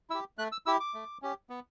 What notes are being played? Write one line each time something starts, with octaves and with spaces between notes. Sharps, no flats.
E4 G4 E6
A3 F#6
E6
E4 G4 E6
D6
A3
C#4 G4
B3